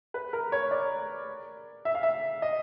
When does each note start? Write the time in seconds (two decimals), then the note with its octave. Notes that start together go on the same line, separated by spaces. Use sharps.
0.14 B4
0.33 A#4
0.52 C#5
0.71 D5
1.85 E5
1.95 F5
2.03 E5
2.42 D#5